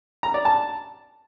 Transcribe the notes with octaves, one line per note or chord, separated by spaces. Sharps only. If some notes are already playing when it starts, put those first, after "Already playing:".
A#5
D5
A5